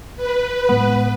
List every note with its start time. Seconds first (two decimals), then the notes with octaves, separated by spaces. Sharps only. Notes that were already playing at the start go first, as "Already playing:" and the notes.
0.16 B4
0.69 A2 G#3 B3